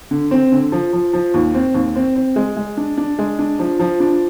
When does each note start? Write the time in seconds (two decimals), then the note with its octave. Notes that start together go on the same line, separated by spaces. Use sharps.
0.11 D3
0.31 C4
0.52 D3
0.72 F3
0.93 F3
1.13 F3
1.34 D#2
1.54 C4
1.74 D#2
1.96 C4
2.16 C4
2.36 G#3
2.56 G#3
2.77 D4
2.98 D4
3.19 G#3
3.39 D4
3.59 F3
3.80 F3
4.00 D4